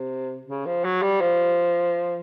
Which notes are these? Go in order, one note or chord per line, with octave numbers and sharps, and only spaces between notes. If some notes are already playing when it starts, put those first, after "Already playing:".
Already playing: C3
C#3
F3
F#3
G3
F3